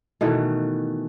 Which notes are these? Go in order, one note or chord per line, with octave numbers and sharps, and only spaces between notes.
B2 D#3 E3 A3